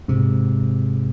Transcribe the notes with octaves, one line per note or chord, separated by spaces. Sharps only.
G#2 C3